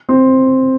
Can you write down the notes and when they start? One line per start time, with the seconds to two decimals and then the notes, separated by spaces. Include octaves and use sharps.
0.09 C4